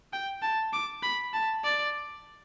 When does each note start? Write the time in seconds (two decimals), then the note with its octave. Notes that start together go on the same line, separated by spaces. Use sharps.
0.13 G5
0.42 A5
0.73 D6
1.03 B5
1.33 A5
1.64 D5